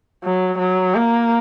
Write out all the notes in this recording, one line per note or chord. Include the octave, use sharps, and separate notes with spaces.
F#3
F#3
A#3